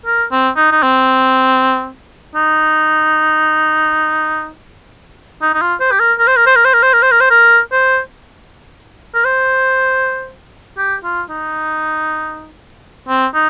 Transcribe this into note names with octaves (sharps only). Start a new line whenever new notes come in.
A#4
C4
D#4
D#4
C4
D#4
D#4
D#4
F4
C5
G4
A#4
A#4
C5
A#4
C5
A#4
C5
A#4
C5
A#4
C5
A#4
C5
A#4
C5
A#4
C5
G4
F4
D#4
C4
D#4